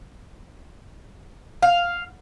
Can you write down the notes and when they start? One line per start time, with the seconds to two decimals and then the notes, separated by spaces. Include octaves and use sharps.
1.62 F5